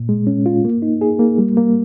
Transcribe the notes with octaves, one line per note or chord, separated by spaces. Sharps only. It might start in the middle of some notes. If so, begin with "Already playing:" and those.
Already playing: A#2
G#3
C#4
F4
A#3
D#4
G#4
A#3
G3
A#3